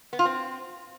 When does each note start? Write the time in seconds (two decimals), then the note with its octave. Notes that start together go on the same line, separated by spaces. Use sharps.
0.13 B3
0.19 F4
0.25 C4